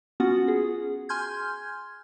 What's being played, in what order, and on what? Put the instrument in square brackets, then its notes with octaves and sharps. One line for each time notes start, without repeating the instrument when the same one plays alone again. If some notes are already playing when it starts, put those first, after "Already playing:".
[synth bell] B3 C#4 F4 F#4 F#5
G#4
G#5 C6 F6 G6 G#6